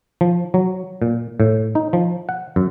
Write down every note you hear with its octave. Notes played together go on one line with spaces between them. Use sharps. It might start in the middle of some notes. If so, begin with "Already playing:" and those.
F3
F#3
A#2
A2
D#4
F3
F#5
F#2